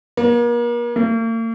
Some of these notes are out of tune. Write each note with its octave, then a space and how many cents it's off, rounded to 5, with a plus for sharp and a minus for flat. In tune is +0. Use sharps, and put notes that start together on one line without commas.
A#3 +40
A#3 -45